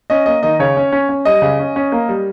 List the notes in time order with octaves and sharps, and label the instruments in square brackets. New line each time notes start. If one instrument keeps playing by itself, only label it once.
[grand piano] C#4 D#5
A#3 D#5
D#3 D#5
C#3 C#5
C#4
C#4
C#4
G3 D#5
C#3
C#4
C#4
A#3
G3